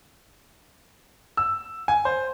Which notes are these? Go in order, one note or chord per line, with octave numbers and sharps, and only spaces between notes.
E6
G#5
C5